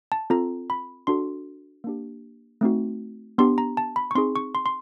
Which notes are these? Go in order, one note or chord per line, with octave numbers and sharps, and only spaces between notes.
A5
C4 F4 A4 A#5
B5
D4 F#4 A4 C6
A#3 D4 G4
A3 C4 D#4 F#4
B3 D4 G4 C6
A#5
A5
B5
C#6
C4 D#4 G#4 C6
C#6
C6
C6